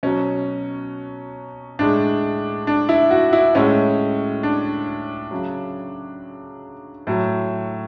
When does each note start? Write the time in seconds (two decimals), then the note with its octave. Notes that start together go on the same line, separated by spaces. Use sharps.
0.03 B2 F#3 C#4
1.79 A2 G#3 D4
2.67 D4
2.89 E4
3.11 F#4
3.33 E4
3.55 A2 G#3 C#4
4.43 D4
5.31 C#3 F#3
7.07 A2 F#3